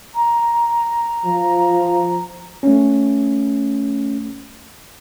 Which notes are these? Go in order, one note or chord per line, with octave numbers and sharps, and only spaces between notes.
A#5
F3
A3 C#4